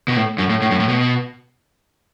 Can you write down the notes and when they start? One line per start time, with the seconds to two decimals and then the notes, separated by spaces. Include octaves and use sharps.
0.08 B2
0.17 A2
0.38 F#2
0.50 A2
0.62 A2
0.71 F#2
0.80 A2
0.89 B2